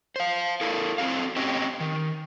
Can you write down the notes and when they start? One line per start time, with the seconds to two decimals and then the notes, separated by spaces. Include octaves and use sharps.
0.16 C5 F5
0.61 E4 A4 A#4
0.98 C4 F#4 A4 F5
1.36 C4 C#4 G4 C#5 D#5 G5
1.80 D#3